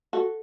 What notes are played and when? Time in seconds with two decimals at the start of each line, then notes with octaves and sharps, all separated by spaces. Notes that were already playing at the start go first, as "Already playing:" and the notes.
0.13 F#4 A4